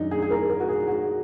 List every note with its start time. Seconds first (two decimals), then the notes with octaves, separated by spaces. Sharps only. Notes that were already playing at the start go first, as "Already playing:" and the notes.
Already playing: F#2 D#3 D4 D#4
0.11 G#4
0.22 G#4
0.31 A#4
0.50 A#4
0.60 F#4
0.69 G#4
0.88 F#4